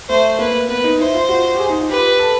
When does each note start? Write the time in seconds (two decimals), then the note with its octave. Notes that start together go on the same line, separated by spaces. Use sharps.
0.09 A3 C5
0.39 A#3 B4
0.69 B3 B4
0.84 D#4
0.99 E4 C5
1.14 F4
1.29 F#4
1.55 G4
1.60 G#4
1.69 D#4
1.79 F4
1.89 G4 B4
2.19 A4